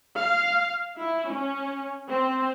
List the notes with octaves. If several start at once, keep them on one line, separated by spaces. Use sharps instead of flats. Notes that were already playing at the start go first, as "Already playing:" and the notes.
F5
E4
C#4
C4